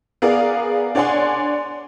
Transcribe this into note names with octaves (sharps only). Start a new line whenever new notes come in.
B3 G#4 A#4 D5 F5
D4 C#5 D5 F#5 G#5 C6